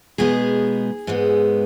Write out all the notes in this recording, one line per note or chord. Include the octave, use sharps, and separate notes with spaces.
B2 G#3 B3 D#4 G#4
G#2 G#3 B3 D#4